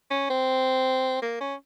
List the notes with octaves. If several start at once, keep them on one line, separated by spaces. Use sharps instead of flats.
C#4
C4
A#3
C#4